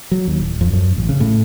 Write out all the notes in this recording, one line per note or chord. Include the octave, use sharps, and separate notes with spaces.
F#3
D#2
D1
F2
F#2
A1
C#3
A2